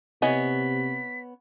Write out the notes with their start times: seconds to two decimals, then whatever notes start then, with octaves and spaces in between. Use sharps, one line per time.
0.22 C3 B3 E4 C#5 D#5 G#5 B6